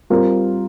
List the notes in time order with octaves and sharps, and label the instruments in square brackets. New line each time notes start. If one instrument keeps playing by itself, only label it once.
[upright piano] G3 C4 F4 A#4